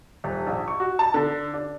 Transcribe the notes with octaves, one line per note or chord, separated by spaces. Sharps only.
D#1
A#1
C#6
F#4
A5
D3
D4